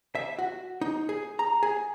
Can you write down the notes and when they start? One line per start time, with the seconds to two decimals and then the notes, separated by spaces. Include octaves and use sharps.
0.15 E5
0.39 F#4
0.81 D#4
1.09 G#4
1.39 A#5
1.63 G#4